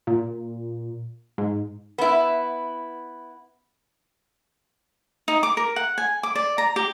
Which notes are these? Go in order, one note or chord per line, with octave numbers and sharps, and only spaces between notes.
A#2
G#2
B3 E4
D#4
D6
A#4
F#5
G#5
D6
D5
A#5
G4